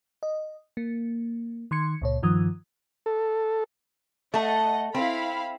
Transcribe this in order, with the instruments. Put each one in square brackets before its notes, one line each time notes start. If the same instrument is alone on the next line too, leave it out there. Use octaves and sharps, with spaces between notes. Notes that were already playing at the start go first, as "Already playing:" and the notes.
[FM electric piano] D#5
A#3
D#3 C6 G#6 C#7
C#2 A#2 C#5
G2 D#3 F3 D#6
[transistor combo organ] A4
[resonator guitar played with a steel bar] A3 A5 [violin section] D#5 F#5
[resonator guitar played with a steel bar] C4 [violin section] E4 F5 B5